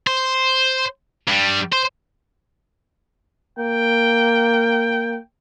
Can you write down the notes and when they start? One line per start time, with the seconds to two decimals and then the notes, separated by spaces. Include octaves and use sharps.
0.07 C5
1.28 G2 G3
1.73 C5
3.59 A#3 G5